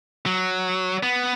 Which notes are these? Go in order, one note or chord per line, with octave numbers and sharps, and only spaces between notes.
F#3
B3